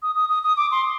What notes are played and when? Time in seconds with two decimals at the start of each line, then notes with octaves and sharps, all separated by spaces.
0.03 D#6
0.15 D#6
0.29 D#6
0.43 D#6
0.57 D6
0.71 C6